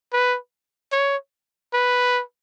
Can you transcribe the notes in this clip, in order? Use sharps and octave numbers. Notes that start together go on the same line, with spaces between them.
B4
C#5
B4